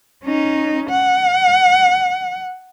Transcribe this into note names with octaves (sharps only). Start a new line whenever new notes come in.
C#4 D#4
F#5